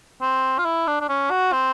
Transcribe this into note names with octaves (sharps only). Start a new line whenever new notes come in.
C4
F4
E4
D4
D4
C#4
F#4
C4